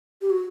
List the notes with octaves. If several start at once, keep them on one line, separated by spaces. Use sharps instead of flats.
G4
F#4